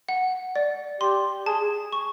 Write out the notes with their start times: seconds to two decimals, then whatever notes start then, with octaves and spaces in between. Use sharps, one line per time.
0.09 F#5
0.55 D5
1.01 G4 C6
1.46 G#4 A5
1.92 C#6